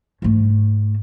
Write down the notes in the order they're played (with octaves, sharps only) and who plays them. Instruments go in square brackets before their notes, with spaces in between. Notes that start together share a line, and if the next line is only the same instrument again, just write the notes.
[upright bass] G#2 A3